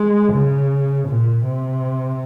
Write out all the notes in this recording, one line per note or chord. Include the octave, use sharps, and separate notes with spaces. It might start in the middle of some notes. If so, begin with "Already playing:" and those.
Already playing: G#3
C#3
A#2
C3